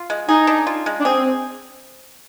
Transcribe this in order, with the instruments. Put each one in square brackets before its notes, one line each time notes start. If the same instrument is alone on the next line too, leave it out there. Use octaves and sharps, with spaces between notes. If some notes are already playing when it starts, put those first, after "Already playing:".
Already playing: [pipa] F4
G#3
[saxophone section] D#4 [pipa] G#4
[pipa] D4
F4
G#3
[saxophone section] D4
[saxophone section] C4 [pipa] G#4